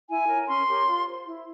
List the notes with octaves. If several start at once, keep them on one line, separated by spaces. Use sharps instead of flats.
E4 G#5
A#4 C#5
C#4 C6
G4 A#4 C#5
F4
C5
E4